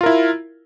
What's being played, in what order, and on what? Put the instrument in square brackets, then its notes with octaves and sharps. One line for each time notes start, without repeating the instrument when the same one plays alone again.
[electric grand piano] F4
A#4
E4